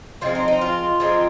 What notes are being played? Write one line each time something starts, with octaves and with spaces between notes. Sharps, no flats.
F3 G#3 C4 F4
D#4
D#4
F4
F3 G#3 C4 D#4